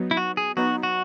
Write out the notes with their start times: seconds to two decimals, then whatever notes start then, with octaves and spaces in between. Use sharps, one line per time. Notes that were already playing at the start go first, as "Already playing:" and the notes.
Already playing: F#3 B3 D#4
0.11 E4
0.17 F#4
0.37 G#4
0.57 F#3 B3 D#4 F#4
0.83 F#4